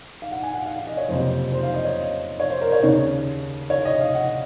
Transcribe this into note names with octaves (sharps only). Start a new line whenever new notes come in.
F5
F#5
G#5
F#5
F5
F5
D#5
C#5
F#1 F2 C3 C5
C5
F5
D#5
C#5
C#5
C5
A#4
C#5
D#2 C#3 C#5
C#5
D#5
F5
F#5